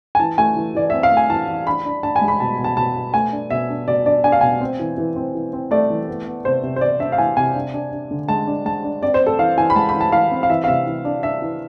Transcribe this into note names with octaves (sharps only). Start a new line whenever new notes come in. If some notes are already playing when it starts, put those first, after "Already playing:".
G#5
E3 A5
A3 G#5
E3
E3 D5
C4 E5
F5
A3
G#5
E3 A5
E3
D4 B5
D4
D4 A5
G#5
G#3
B5
B2 A5
B2
A5
B2 A5
B3
A3 G#5
D4
B2 E5
D4
B2 D5
D4 D5
D4 G#5
F5
B2 G#5
C4
E3
E3
C4
E3
C4
A3 D5
E3
B3
B3
C3 C5
C3
C5
B3 D5
D4 E5
F5
E3 G#5
C3 G#5
D4
D4
D4
D3
G#3 A5
D4
G#3 A5
D4
C4 D5
C5
C4
A4
E3 F5
E3 G#5
B5
G#3 A5
B5
E3
A5
E3 F5
C4
F5
E3 E5
F5
C3 E5
E3
D4
D4 E5
E3